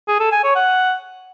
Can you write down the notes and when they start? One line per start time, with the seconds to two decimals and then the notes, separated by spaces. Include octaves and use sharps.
0.08 G#4
0.20 A4
0.32 G#5
0.43 C#5
0.55 F#5